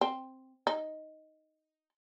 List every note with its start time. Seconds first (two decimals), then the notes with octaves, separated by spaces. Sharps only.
0.01 C4
0.67 D#4